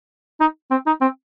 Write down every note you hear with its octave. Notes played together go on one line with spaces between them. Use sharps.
D#4
C4
D#4
C4